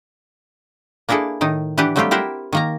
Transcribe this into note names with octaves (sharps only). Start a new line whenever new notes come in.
A#3 D4 E4 G#4 A4
A2 D#3 D#4
E3 D4 G4 B4 F#5
F#3 G3 A3 C4 F4 G4
E4 G4 A#4 C5 F#5
D#3 A#3 A#5